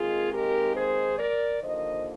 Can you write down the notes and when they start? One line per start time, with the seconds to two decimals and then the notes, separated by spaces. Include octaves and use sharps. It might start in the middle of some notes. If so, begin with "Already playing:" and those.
Already playing: D#2 D#3 G#3 C4 F4 G#4
0.32 G4 A#4
0.74 G#4 C5
1.17 A#4 D5
1.61 D#2 D3 F3 A#3 C5 D#5